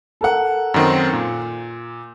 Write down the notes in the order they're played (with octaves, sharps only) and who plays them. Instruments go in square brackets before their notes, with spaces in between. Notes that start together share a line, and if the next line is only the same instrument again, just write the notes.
[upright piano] A4 A#4 F#5
[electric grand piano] F#2 D#3 C4
A#2